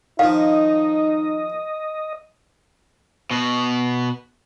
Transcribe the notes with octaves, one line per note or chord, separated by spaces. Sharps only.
D#3 F3 D#4 D#5 F5
B2 F#4